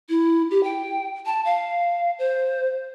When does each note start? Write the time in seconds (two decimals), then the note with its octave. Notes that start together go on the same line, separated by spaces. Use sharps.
0.09 E4
0.51 G4
0.64 G5
1.26 A5
1.45 F5
2.19 C5